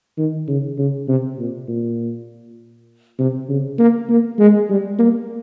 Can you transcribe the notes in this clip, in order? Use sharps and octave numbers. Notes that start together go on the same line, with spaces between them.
D#3
C#3
C#3
C3
A#2
A#2
C3
C#3
A#3
A#3
G#3
G3
A#3